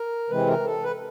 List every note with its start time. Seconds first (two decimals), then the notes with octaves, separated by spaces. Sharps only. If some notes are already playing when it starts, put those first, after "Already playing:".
Already playing: A#4
0.30 C3 E3 G#3 C4 B4
0.47 A#4
0.65 A4
0.84 B4